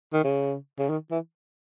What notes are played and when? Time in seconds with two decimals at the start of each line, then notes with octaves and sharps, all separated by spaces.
0.13 D#3
0.24 C#3
0.79 C#3
0.89 D#3
1.11 E3